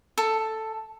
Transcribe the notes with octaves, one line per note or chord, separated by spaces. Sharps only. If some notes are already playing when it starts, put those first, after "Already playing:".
A4